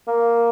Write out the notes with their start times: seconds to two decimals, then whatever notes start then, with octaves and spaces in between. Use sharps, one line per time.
0.07 A#3